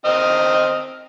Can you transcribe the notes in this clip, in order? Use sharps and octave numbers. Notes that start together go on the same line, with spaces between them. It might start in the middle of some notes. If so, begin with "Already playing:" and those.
C4 D#5 F6